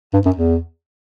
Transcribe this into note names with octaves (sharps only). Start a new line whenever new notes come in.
G2
F#2
E2